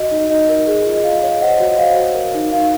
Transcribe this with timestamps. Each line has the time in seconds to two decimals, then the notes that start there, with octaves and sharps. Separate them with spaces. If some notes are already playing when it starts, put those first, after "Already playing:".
Already playing: F#4 D#5
0.11 D#4
0.30 D#4 D#5
0.49 A#4
0.67 G#4
0.86 F4
0.92 D#5
1.04 F4 F5
1.23 C#5 F5
1.41 C5 D#5 F#5
1.60 F#4
1.72 D#5
1.78 C5 F5
1.97 F#4
2.15 A#4
2.34 D#4
2.52 D#4 F5